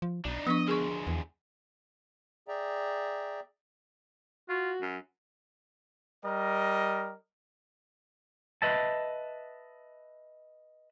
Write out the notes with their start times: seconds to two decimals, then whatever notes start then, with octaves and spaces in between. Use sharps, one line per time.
0.02 F3
0.25 B1 D4 D#4
0.47 F3 B3 D4 D#5 C#6
0.68 D2 G#3 G#4 A#4 C#6
1.07 E2
2.48 G#4 D5 E5 G5 A#5
4.49 F4 F#4
4.81 F#2
6.23 G3 A#4 D#5
8.62 B4 D#5 E5 A5